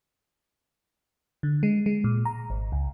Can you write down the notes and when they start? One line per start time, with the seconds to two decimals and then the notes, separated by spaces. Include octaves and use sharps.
1.43 D3
1.63 G#3
1.86 G#3
2.04 A#2
2.25 A#5
2.50 G#1
2.72 C#2